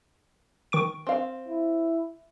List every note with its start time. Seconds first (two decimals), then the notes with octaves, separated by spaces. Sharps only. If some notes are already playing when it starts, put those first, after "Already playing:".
0.72 D#3 C#6 D7
1.07 C4 F5
1.48 E4